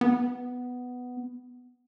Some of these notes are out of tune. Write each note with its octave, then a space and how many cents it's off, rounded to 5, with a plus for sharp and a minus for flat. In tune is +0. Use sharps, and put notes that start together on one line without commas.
B3 +5